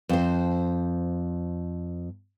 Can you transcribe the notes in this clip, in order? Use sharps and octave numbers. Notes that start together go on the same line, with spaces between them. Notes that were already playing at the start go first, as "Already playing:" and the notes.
F2 C5